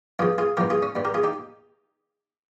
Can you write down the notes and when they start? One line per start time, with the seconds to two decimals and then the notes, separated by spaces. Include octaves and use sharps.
0.19 G2 F3 F4 G#4
0.38 F4 G#4
0.57 G2 F3 G4 A#4
0.70 F4 G#4
0.82 C#4
0.95 G2 G3
1.05 G4 A#4
1.14 F4 G#4
1.23 D#4 G4